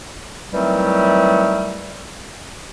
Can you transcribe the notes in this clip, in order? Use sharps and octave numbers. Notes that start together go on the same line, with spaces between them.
D#3 E3 F#3 G3 A3 C4